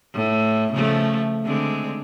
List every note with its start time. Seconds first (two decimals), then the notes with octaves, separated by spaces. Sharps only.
0.14 A2
0.73 C#3 F3 A3
1.45 D3 G#3 C4